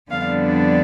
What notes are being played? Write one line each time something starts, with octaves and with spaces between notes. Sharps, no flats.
F2 D3 G3 B3 D4 F5